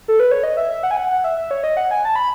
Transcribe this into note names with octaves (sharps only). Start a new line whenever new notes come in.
A4
B4
C#5
D#5
E5
E5
F#5
G#5
F#5
F#5
E5
E5
C#5
D#5
F#5
G#5
A5
B5